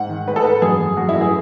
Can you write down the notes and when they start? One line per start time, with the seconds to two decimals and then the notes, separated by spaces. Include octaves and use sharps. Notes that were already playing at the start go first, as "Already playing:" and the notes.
Already playing: G#2 F#5
0.09 D#3
0.28 G#2 B4
0.36 A4
0.44 G#2 B4
0.62 F#2 G#4
0.80 F#2
0.97 F#2 F#4
1.09 E4
1.16 F#2
1.21 G#4